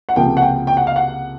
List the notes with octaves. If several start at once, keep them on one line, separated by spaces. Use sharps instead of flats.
F#5
C#2 C3 F3 A#3 G5
F#5
G5
G5
F#5
F5
F#5